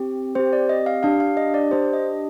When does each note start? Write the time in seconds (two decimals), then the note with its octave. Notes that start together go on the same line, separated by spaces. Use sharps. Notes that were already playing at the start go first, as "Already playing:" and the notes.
Already playing: C4 G4
0.35 C4 G4 C5
0.53 D5
0.69 D#5
0.86 F5
1.03 D4 G4 F5
1.20 F5
1.37 D#5
1.54 D5
1.71 D4 G4 C5
1.93 D#5